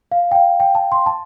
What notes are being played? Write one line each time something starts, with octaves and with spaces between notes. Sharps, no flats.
F5
G5
F5
G5
A5
C6
A5